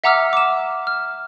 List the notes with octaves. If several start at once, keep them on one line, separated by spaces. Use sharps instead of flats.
E5 F#5 A#5 D6 E6 F6
D6 E7
F6